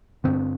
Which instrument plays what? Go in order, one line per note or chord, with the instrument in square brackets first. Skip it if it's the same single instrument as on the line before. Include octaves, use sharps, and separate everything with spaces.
[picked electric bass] G2 D3 C4